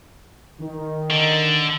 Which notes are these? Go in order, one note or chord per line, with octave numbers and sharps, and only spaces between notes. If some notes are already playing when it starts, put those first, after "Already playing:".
D#3
D3